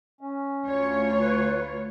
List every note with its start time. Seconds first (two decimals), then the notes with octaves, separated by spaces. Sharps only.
0.21 C#4
0.63 D2 F4 C#5
1.21 B4